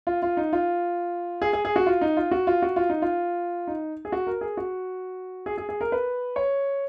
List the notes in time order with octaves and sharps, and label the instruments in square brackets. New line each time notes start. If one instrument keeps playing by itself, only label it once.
[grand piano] F4
F4
D#4
F4
G#4
G#4
G#4
F#4
F4
D#4
F4
F#4
F4
F#4
F4
D#4
F4
D#4
G#4
F#4
A#4
G#4
F#4
G#4
G#4
G#4
A#4
B4
C#5